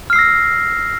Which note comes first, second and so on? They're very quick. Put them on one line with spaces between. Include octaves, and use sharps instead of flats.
F6 C7 E6 A#6